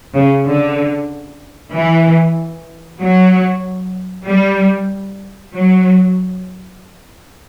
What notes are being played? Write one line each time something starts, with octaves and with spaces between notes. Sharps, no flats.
C#3
D3
E3
F#3
G3
F#3